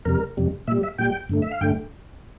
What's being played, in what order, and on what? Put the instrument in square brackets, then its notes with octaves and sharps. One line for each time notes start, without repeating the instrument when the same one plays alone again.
[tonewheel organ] F2 C3 G3 A#4
F2 C3 G3
A#2 G3 E5
E5
A#2 G3 G5
G2 D3 A3
E5
F5
G2 D3 A3 G5